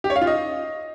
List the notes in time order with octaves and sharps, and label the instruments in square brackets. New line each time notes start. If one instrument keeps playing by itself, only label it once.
[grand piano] G4
C#5
F5
F4
D#5